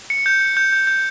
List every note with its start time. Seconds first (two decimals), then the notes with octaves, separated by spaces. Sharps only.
0.10 C#7
0.26 G6
0.41 C#7
0.57 G6
0.73 G6
0.87 G6